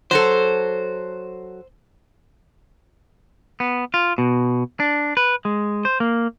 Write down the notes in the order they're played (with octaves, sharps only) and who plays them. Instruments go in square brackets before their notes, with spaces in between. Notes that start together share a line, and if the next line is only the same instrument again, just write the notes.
[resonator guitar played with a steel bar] F#3 F#4 A4 [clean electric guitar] C5
[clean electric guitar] B3
F4
B2
D4
B4
G#3
C5
A#3